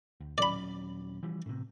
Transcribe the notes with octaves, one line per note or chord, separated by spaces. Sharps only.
D2
D#1 F#3 C#4 D5 B5
E3 F3 G3
A2 C3